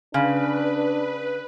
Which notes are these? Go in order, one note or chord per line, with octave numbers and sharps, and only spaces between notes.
C#3 D4 B4